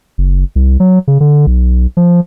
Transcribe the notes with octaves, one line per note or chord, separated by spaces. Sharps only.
F#1
C2
F#3
C#3
D3
B1
F3